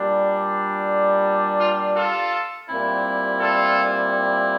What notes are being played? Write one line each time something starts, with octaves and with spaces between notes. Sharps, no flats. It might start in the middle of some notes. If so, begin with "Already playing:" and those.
Already playing: A#2 G3 D4
F4
F4 A4
A#2 G3 C4 E4
F4 A4